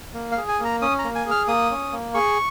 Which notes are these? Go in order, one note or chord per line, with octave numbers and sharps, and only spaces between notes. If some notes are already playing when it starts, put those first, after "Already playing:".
A#3
F5
G#4
G#5
A#3
A#5
C#4 D#6
A#5
A#3
G#5
G#4
F6
A#3 D#6
C#4
A#3
G#4 C#6